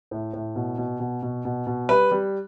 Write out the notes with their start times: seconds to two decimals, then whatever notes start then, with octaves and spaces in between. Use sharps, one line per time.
0.11 A2
0.33 A2
0.56 B2
0.78 B2
1.00 B2
1.22 B2
1.45 B2
1.67 B2
1.89 G3 B4
2.11 G3